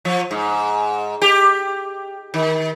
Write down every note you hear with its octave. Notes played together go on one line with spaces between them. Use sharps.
F3
G#2
G4
D#3